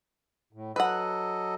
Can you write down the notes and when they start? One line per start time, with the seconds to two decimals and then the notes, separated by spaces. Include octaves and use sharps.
0.53 A2
0.76 F#3 A4 B4 D#5 F#5